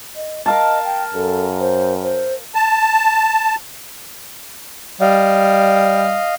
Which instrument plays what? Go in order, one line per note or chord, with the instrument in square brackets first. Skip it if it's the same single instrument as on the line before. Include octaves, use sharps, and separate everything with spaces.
[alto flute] D#5
[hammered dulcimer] A#4 F5 A5 [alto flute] D#5
[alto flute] G5
[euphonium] F#2 [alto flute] A4
[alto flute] C5
C5
[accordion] A5
[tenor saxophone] G3 [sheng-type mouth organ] D#5 F5